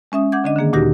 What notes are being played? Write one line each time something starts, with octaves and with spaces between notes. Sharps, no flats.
G#3 C#4 E5 D#6
F#5 D6 G6 G#6
D3 D4 D#5
D3 D#3 A#3 G#4
D2 A#2 D#4 F#4 G4 A#6